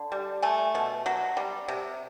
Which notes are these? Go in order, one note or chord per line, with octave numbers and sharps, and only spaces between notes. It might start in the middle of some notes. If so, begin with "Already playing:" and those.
Already playing: D3
G3
A3 G#5
B2
F#3
G3
C3